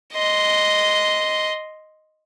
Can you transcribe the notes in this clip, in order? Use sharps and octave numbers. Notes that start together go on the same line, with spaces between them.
D#5 C6